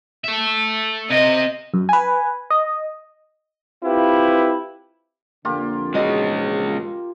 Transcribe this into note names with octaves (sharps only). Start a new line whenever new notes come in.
A4 E5
C3 D#5
F#2
B4 G#5
D#5
C4 E4 F4 G4 B4
F2 D3 A#3 F4 G4
A#1 E2 G#2 G#3 C#4 F#4 D#5